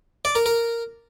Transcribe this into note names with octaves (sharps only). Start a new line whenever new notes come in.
D5
A#4
A#4